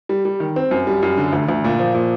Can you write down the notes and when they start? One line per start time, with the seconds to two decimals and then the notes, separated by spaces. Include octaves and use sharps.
0.09 G3
0.25 G3
0.40 D#3
0.56 C4
0.71 F#2
0.87 G3
1.03 F#2
1.18 D3
1.33 D2
1.49 D2
1.64 A#2
1.80 F3
1.94 A#2